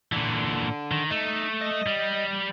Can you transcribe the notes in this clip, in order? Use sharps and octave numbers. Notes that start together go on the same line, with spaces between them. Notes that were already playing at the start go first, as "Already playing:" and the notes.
A#2 D3 E3
D#3
A3 D#4
D#5
G3